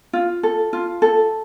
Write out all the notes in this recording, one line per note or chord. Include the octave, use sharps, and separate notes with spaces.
F4
A4
F4
A4